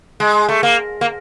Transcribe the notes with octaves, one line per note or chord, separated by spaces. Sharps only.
G#3
A3
A#3
A#3